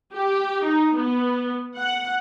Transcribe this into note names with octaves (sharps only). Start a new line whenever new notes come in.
G4
D#4
B3
F#5